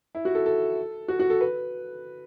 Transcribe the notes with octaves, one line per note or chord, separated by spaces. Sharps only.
E4
F#4
A4
A4
F#4
F#4
A4
B4